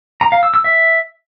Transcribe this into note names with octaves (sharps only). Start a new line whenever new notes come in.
A#5
F5
E6
E6
E5